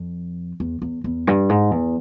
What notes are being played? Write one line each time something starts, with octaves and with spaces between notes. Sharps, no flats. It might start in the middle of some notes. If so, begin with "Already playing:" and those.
Already playing: F2
E2
E2
E2
G2
G#2
E2